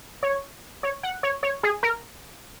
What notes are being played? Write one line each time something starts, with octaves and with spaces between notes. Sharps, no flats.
C#5
C#5
F#5
C#5
C#5
G#4
A#4